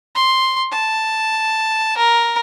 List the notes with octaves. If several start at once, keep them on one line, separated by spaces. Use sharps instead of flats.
C6
A5
A#4